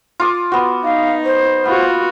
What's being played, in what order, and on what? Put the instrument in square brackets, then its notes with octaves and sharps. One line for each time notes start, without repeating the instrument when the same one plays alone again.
[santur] F4 D6 D#6
B3 F#4
[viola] D#4 [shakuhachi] F5
[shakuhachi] C5
[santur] B3 [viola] F4 F#4